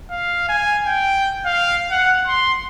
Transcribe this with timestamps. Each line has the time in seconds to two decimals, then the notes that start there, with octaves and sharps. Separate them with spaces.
0.11 F5
0.49 G#5
0.84 G5
1.46 F5
1.91 F#5
2.27 C6